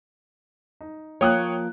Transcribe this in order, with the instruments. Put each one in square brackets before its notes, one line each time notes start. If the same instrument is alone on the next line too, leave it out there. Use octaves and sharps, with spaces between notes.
[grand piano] D#4
[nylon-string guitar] F3 A#3 F5 [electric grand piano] C#5 [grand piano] G5 D#6 F#6